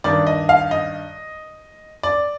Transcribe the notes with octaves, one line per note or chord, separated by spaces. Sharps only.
G2 D#3 D5
D#5
F5
D#5
D5